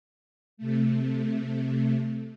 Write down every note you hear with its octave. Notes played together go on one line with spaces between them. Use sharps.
C3 A3